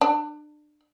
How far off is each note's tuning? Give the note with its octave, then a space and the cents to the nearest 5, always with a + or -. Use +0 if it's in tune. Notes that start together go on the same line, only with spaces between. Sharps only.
D4 +30